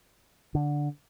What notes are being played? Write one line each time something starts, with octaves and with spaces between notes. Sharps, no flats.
D3